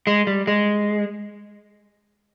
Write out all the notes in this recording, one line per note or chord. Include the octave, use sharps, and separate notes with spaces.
G#3
G3
G#3